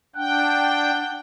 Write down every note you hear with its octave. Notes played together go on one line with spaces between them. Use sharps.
D4 F#5 G5